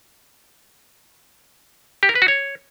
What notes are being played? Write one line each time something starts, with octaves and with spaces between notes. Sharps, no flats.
G4
A#4
B4
F#4
C#5